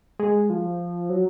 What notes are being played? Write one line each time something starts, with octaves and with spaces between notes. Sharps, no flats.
G#3
F3
F#3